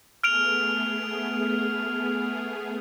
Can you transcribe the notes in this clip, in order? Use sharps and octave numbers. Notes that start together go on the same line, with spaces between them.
A3 B3 G#4 F6 D7 F7